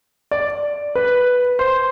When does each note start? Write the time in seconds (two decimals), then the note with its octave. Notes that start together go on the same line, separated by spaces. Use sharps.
0.31 D5
0.95 B4
1.59 C5